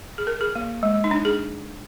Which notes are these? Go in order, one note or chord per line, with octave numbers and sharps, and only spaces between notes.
G#4
A#4
G#4
A#3
G#3
D#4
D4
G#4